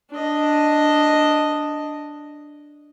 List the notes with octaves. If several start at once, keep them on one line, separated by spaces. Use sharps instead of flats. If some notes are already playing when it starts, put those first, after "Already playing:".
D4 D#5